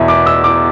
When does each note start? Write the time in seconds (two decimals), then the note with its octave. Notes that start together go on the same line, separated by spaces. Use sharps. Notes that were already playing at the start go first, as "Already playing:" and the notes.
Already playing: E2 B2 E5
0.08 D6
0.26 E6
0.44 D6